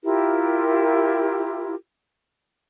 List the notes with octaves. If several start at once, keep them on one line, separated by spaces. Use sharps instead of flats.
E4 F4 G4 A#4